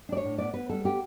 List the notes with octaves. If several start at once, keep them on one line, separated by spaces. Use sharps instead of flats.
D4 D5
C#5
A2
B3 D5
B3 B4
G3 A4
B3 G4